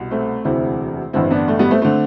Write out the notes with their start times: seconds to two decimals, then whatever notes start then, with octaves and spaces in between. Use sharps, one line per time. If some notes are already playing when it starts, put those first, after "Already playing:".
Already playing: C2 B2
0.11 A3 C4
0.45 E1 D2 C3 E3 C4 E4
1.13 A1 G2 D3 C4 E4
1.31 B3 D4
1.48 A3
1.59 G3 B3
1.71 A3 C4
1.82 D3 A3 C4